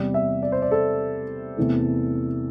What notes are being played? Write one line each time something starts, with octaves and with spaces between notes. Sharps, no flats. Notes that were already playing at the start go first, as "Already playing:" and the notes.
Already playing: E2 C3 G3 D5
E5
D5
C5
D5
A4
E2 C3 E3 A3